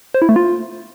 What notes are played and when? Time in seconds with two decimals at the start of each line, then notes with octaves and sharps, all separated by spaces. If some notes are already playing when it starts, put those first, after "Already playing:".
0.14 C5
0.22 E4
0.29 A3
0.36 F4